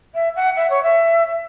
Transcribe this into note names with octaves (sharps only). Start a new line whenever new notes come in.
E5
F#5
E5
C#5
E5